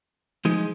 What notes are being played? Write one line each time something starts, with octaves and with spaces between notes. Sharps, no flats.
F3 G#3 D#4